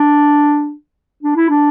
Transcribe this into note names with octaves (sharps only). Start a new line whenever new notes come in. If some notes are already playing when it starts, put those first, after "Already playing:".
Already playing: D4
D4
E4
D4